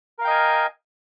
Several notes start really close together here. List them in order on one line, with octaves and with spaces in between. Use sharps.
A#4 F5 G5 D#5 G#5